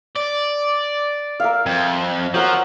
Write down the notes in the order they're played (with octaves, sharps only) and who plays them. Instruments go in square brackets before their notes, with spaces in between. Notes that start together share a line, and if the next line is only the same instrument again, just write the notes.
[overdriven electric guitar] D5
[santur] A#4 E5 F5
[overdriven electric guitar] F2 [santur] A5
[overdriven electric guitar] F3 [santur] F#3 A#4 F#5